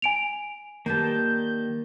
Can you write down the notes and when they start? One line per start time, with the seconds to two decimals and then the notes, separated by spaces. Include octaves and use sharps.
0.02 G#5 D7 F7
0.86 D#3 G3 A#3 B4 A5 G6